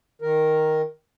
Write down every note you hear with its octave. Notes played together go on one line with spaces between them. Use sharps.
D#3 A#4